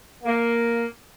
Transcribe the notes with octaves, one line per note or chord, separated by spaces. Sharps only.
A#3